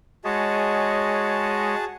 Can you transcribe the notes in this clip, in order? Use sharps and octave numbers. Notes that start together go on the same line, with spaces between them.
G#3 F#4 G#4 C#5 D#5 A5